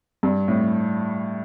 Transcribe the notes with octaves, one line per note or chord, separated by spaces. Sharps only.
G2
A2